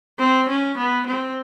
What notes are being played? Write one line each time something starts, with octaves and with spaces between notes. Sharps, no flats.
C4
C#4
B3
C4